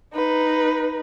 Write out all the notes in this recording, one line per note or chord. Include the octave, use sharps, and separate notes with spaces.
D#4 B4